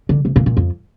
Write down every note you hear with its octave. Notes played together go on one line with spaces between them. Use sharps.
D3
C3
A#2
A#2
F2